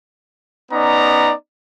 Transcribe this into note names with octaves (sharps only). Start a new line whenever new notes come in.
B3 C#4 D#4 D5 A#5